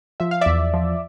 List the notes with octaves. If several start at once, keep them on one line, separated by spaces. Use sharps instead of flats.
F3 E5
F5
E2 D5 E5
F3